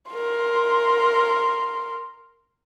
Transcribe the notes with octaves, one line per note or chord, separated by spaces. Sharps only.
A#4 C6